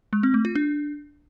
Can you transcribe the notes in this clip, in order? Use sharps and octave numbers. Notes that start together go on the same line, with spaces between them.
G#3
C4
A3
F4
D4